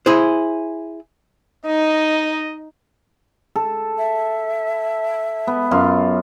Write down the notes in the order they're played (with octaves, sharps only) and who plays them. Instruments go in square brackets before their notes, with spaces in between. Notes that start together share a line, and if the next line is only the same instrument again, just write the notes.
[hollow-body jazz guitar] E4 G#4 C5
[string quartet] D#4 [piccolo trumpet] D#5
[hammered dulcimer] A4
[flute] E5
[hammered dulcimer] B3
F#2 F4